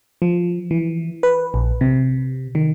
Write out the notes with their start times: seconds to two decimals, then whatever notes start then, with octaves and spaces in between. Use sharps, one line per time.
0.22 F3
0.71 E3
1.23 B4
1.54 A#1
1.81 C3
2.55 D#3